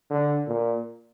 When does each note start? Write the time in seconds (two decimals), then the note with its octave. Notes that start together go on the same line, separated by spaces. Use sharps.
0.10 D3
0.47 A#2